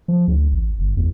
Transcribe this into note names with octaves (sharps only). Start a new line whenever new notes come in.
F3
D2
A1
G1
E2